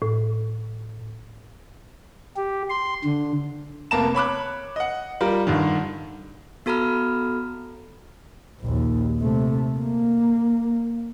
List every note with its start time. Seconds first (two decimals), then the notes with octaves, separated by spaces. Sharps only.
0.02 A2
2.36 G4
2.70 C6
3.05 D3
3.91 F1 A#3 B3 A5 A#5 E7
4.15 C#5 B5 D6 F#6
4.76 D#5 F#5
5.21 G3 F4 A#4
5.47 G2 D3 D#3
6.66 B3 F#4 A4 A#5 B5 F6
8.61 A#1 D#2
9.20 C3 A3
9.79 A#3